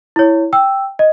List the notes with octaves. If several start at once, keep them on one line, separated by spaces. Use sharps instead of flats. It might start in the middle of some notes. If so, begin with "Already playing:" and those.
E4 C#5
G5 E6
D#5